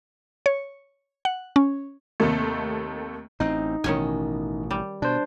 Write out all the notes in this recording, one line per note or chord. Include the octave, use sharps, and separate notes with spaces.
C#5
F#5
C#4
D#2 C3 D#3 A3
A1 C4 D#4
A1 B2 D#3 C#4 G#5
G3
B2 D4 C5